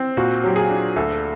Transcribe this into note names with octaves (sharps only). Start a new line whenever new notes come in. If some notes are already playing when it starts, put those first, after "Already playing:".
Already playing: C4
A#2 F#4
F#3 G4
G#4
D4
D2 A4